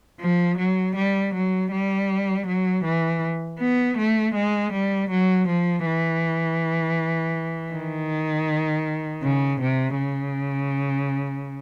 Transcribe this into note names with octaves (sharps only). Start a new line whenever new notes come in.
F3
F#3
G3
F#3
G3
F#3
E3
B3
A3
G#3
G3
F#3
F3
E3
D#3
C#3
C3
C#3